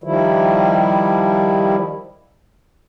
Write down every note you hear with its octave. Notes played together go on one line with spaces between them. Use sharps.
D#3 F3 G3 E4